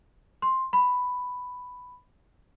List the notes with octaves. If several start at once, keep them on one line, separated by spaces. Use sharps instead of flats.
C6
B5